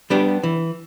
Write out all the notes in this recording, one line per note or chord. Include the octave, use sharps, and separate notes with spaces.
G3 B3 D4 G4
E3